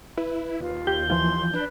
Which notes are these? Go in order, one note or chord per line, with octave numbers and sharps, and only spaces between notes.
E4 B4
D#2 F4
G4 G6
E3 F3 F4 C6
D4 B4